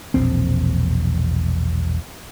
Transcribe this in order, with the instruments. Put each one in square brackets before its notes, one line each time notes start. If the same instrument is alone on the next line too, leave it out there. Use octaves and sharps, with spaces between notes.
[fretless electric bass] E1 A#1 C4